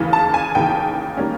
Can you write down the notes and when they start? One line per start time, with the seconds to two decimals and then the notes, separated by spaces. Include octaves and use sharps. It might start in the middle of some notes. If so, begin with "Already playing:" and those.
Already playing: D#2 C#3 E3
0.13 A5
0.34 G#5
0.55 D#2 C#3 E3 G5
1.17 D#3 G3 A#3 C#4